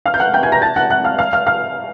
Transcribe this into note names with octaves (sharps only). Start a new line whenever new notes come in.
F5 F6
G6
F#5 F#6
G5 G6
G#5 G#6
A#5 A#6
A5 A6
F#5 F#6
F#5 F#6
F5 F6
F5 F6
F5 F6
F5 F6